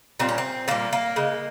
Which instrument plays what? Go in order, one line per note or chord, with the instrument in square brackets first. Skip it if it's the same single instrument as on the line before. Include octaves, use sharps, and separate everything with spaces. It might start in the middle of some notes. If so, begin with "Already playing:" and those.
[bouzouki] A#2 G3 C4
C#4
C4
A#2 G3 A#3
A#3
C#3 G#3